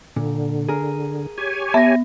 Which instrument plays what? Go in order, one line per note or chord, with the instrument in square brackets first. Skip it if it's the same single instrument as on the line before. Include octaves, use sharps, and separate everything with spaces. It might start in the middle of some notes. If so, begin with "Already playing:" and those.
[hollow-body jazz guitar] A#2 [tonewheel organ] D3
[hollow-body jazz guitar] G#4 A#4
[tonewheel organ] G4 C#5 G#5
[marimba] B3 [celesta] E5 A#6 [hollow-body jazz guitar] A5